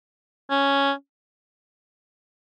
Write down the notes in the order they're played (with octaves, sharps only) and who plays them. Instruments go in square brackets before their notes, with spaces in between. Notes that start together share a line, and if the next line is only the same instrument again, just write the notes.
[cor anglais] C#4